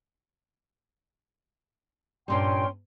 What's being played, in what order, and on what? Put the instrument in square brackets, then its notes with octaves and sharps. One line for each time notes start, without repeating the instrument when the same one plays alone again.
[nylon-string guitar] G2 A#2 G3 [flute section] C#4 G5 C6